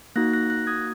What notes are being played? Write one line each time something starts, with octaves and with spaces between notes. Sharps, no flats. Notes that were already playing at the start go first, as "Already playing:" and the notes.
A#3 D#4 F#4 F#6 A#6
F#6 A#6
F#6 A#6
D#6 G#6